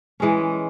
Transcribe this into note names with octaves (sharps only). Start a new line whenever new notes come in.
E3 G#3 C#4